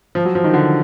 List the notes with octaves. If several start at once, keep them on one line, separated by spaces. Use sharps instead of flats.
F3
F#3
F3
D#3
D3